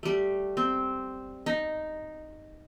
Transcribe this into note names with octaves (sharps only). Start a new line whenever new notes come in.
G3 A3
C4
D#4